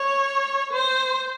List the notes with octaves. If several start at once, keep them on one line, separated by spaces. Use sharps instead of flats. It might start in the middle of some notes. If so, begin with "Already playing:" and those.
Already playing: C#5
C5